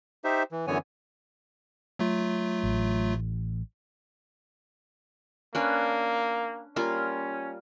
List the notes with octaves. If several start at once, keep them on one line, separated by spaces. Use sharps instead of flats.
D#4 G4 C5 E5
E3
F#2 D3 E3 B3 C#5 G#5
F#3 A3 F4
A1
A#3 C#4 D4 B4
G3 A#3 C#4 F4